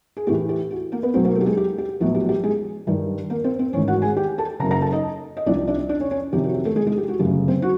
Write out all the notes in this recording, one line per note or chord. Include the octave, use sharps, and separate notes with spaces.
G#4
A2 E3 A3 G4
G4
F#4
A#3 A#4
B3 B4
B1 B2 F#3 A3 C4 C5
A#3 A#4
A3 A4
G4
G#3 G#4
G4
G4
A#1 A2 F#3 B3 F#4
G4
G4
G#3 G#4
G2 D#3 G3
A#3 A#4
C4 C5
C4 C5
A1 G#2 D#3 C#4 C#5
F#4 F#5
G#4 G#5
G4 G5
A4 A5
F#1 F#2 C#3 A#4 A#5
A#4 A#5
A4 A5
D#4 D#5
D#5
C2 C3 F3 D4 D5
D4 D5
D4 D5
C#4 C#5
C#4 C#5
F2 C3 D#3 G4
F#4
G4
A3 A4
G#3 G#4
G#3 G#4
G4
F#4
G1 F#2 C#3 F#3 A3 G4
C4 C5
F#4